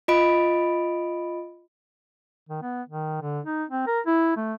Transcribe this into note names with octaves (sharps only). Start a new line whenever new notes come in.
F4 D#5 B5 D7
D#3
B3
D#3
D3
D#4
C4
A#4
E4
A3